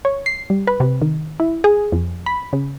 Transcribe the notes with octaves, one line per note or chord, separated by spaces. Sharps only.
C#5
C7
G3
B4
C3
D#3
E4
G#4
F2
B5
C#3